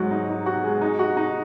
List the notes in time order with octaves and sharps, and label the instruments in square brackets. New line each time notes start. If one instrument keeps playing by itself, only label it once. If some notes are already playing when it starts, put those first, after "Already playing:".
Already playing: [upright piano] G#2 F#3 F#4
D#4
D#4
F#4
G#3
D#4
F#4
D#4